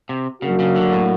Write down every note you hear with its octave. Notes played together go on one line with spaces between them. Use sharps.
C3
C#3 F#3 A#3 D4 F#4
C#3
D3
A2